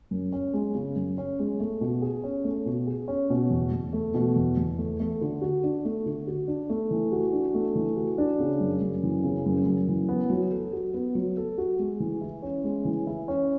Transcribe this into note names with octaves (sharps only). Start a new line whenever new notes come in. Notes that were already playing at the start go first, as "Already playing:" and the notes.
F#2
C#4
G#3
C#3
F#2
C#4
G#3
A3
B2
G#4
C#4
A3
B2
G#4
C#4
B2
E2
E2
A3
B2
E2
E2
A3
A3
D3
F#4
D4
A3
D3
F#4
D4
A3
E3
F#4
D4
A3
E3
F#4
D4
C#3
F#2
F#2
E3
C#3
F#2
F#2
E3
B3
F#3
A4
F#4
B3
F#3
A4
F#4
G#3
E3
E4
C#4
G#3
E3
E4
C#4